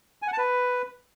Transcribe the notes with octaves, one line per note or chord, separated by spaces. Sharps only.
G#5
F#5
A5
B4